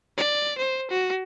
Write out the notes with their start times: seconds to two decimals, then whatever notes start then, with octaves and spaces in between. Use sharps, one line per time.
0.18 D5
0.58 C5
0.91 F#4